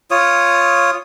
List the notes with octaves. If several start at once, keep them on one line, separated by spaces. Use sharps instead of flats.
F4 C#5 D#6